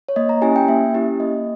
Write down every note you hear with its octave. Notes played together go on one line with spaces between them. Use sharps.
C#5
A#3 D#5
A#5
C#4 E4 G4 G#5
G5
A#3 E5
C#4 E4 G4
A#3 D#5